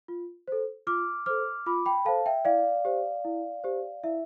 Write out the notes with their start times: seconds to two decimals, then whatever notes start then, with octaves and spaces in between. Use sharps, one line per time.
0.08 F4
0.48 A4 C5
0.87 F4 D6 F6
1.26 A4 C5 D6 F6
1.66 F4 B5 D6
1.86 G5 B5
2.05 A4 C5 F5 A5
2.26 E5 G5
2.45 E4 D5 F5
2.85 G4 C5
3.25 E4
3.64 G4 C5
4.04 E4 E5